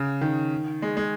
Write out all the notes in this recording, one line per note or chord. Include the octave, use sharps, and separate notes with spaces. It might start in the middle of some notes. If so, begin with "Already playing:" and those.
Already playing: C#3
D#3
G#3
G#3